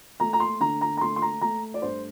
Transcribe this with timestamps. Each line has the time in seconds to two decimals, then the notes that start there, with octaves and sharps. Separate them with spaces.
0.20 A3 A#5
0.33 A#5
0.40 C6
0.60 D3 A#5
0.81 A#5
0.97 A#5
1.01 A3 C6
1.16 C6
1.22 A#5
1.41 A3 A#5
1.74 D5
1.82 G2 C5